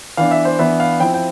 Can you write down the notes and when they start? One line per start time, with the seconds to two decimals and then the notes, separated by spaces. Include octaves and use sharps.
0.17 E3 B3 D4 F5
0.31 E5
0.45 C5
0.59 E3 B3 D4 E5
0.80 F5
1.00 F3 C4 E4 G5
1.14 G5